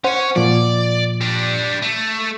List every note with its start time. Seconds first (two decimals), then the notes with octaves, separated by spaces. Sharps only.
0.04 C#4 C5 C#5 F#5
0.36 A#2 F3 D5
1.21 G3 D4
1.82 A3